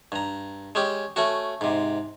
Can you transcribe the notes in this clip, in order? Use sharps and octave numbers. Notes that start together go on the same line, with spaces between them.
G2 A#5
G#3 C#4 G4
A3 C#4 F#4
G#2 C3